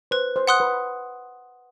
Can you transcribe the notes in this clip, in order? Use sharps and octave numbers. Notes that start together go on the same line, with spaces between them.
B4 C5
C5
F#5 C6 D#6 F#6
B4